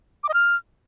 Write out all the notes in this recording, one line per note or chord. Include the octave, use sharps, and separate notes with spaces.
D6
D#5
F6